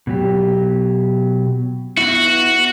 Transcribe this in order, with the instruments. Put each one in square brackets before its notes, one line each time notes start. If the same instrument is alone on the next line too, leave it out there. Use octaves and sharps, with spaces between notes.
[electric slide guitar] B2 F#3 G4
[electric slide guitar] B3 E4 [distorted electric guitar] F#4